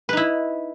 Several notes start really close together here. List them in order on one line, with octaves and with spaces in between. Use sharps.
B4 D#4 E4